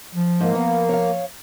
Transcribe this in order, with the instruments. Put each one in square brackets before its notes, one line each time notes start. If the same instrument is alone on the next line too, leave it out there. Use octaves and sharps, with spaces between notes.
[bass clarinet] F3
[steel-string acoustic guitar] G#2 [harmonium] A#3
[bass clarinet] F3 [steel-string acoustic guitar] B3
[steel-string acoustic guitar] C#5 F5